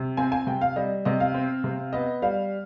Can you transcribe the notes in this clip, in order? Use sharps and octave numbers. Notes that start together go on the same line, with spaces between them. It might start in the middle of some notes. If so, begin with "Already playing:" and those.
Already playing: C3
C4 G#5
G#5
C3 G5
F5
G3 D#5
C3 D#5
F5
C4
C3
B3 D#5
G3 F5